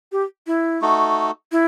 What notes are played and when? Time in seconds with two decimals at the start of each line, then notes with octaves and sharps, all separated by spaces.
0.12 G4
0.47 E4
0.82 A3 D#4 F#4 A4
1.52 E4